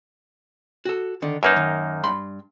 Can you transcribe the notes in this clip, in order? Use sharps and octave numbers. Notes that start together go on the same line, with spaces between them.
F#4 A4
D3 D#3
F#2 A#3 D#4 B4 E5
D#3
G2 B5 C6